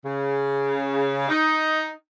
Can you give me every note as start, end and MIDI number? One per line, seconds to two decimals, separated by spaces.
0.05 1.26 49
1.28 1.90 63